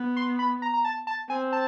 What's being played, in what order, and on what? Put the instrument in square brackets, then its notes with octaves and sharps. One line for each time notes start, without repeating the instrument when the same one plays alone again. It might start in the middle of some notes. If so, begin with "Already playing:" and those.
Already playing: [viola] B3
[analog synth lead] C6
B5
A#5
A#5
A5
A5
[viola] C4 [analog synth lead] G#5
[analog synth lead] A5